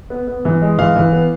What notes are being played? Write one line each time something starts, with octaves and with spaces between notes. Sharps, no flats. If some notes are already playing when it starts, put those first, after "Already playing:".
B3
B3
E3
G#3
E3 F5
E3
B3